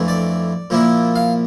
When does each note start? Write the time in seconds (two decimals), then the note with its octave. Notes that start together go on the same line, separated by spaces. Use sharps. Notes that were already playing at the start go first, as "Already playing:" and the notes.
Already playing: F2 E3 A3 D4
0.08 D5
0.70 A#2 F3 A#3 E4
1.16 F5